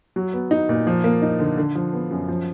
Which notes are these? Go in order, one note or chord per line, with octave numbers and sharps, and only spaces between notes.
F#3
B3
D#4
A#2
F3
A#3
D#4
D3
D3
F3
B3
F#2
F3